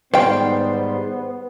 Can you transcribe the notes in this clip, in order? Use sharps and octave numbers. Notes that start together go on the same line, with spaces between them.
G#2 D#3 G3 B3 C5 G5